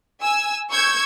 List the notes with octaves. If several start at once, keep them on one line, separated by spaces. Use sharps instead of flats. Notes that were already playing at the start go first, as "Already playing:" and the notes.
G#5 E6
C#6 E6 G6 G#6